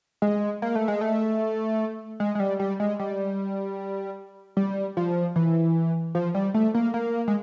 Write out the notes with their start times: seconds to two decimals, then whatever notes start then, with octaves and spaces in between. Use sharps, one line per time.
0.22 G#3
0.62 A#3
0.75 A3
0.88 G#3
1.01 A3
2.20 G#3
2.35 G#3
2.40 G3
2.59 G3
2.80 G#3
2.99 G3
4.57 G3
4.97 F3
5.36 E3
6.15 F3
6.35 G3
6.54 A3
6.75 A#3
6.94 A#3
7.28 G#3